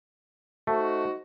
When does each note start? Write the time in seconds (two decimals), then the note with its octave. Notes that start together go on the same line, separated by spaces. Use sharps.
0.67 A3 D#4 F#4 C5